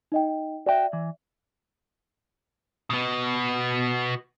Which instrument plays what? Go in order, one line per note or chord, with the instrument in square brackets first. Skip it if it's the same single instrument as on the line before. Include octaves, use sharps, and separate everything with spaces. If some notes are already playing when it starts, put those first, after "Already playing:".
[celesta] D#4 D#5 G5
[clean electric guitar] F#4 G5 [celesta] D5 E5
[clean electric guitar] E3
[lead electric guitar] B2 B3